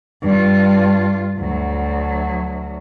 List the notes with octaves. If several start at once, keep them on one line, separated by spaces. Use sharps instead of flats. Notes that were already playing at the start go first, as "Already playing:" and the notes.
G2 F4
D2 F#3